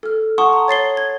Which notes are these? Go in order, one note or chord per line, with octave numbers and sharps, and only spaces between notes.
A4 F6
F#5 A5 C6 C#6 D#6
A#5
C#5 A6 C7 G7
G#6